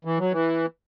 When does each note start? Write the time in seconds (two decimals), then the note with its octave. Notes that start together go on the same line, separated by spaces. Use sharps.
0.05 E3
0.19 F#3
0.32 E3